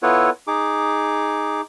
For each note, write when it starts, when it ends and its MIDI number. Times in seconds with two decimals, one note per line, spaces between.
0.03 0.30 59
0.03 0.30 64
0.03 0.30 65
0.03 0.30 69
0.03 0.30 71
0.03 0.30 73
0.47 1.61 63
0.47 1.61 68
0.47 1.61 86